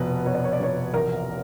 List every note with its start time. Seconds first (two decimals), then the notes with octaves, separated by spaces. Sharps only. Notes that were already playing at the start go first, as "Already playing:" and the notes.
Already playing: F1 B2 B4
0.25 B2 C#5
0.34 D5
0.44 C#5
0.53 D5
0.60 F1 C#5
0.93 A1 A#4